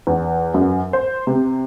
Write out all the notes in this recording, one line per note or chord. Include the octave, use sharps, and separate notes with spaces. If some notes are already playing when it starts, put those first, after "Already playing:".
E2
F#2
C5
C3